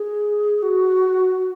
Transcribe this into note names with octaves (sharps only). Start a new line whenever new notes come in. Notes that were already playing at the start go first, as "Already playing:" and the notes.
Already playing: G#4
F#4